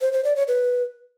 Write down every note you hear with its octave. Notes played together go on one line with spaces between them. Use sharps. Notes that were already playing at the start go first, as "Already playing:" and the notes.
C5
C5
D5
C#5
B4